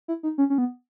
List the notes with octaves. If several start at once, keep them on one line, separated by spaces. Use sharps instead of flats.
E4
D#4
C#4
C#4
B3